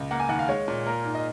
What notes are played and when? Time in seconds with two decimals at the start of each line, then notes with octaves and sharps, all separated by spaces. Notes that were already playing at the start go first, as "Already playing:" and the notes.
Already playing: C#2
0.11 A#3 F#5
0.20 G#5
0.29 D#2 F#5
0.39 F5
0.48 G#3 C#5
0.68 A#2
0.86 A#3 A#4
1.04 G#2
1.14 D#5